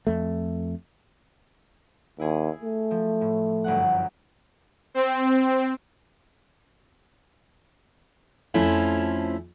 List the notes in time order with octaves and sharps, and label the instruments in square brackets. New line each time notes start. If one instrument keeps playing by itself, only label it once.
[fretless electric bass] F2 A3
[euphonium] D#2 [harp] E4 G#4
[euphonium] A3
[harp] F3
A2
G1 F#2 F#5
[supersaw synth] C4
[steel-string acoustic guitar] F2 F3 A3 C#4 E4 A4